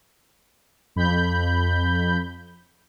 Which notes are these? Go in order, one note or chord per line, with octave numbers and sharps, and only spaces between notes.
F2 B5 G6